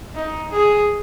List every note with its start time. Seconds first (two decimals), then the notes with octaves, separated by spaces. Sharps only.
0.15 D#4
0.51 G#4